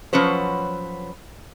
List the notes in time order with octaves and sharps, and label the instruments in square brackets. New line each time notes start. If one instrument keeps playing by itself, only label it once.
[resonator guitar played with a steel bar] F3 F#3 C#4 B4 C5